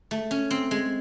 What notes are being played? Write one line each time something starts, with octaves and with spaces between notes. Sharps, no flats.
A3
C#4
C4
G#3